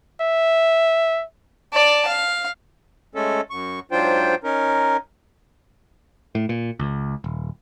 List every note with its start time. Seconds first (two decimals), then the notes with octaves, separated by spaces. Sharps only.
0.22 E5
1.73 D5 A5
2.07 F5
3.15 G#3 A3 C#4 A4
3.50 F#2 C#6
3.91 G#2 F#3 D4 F4 C5 G5
4.44 C#4 D#4 A#4
6.35 A2
6.49 A#2
6.79 C#2
7.24 D#1